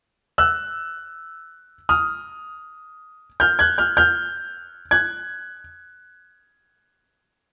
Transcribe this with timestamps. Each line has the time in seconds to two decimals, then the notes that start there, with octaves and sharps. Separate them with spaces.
0.38 E6 F#6
1.89 D#6 F6
3.40 F6 G6
3.59 F#6 G#6
3.78 F6 G6
3.97 F6 G6
4.91 F#6 G#6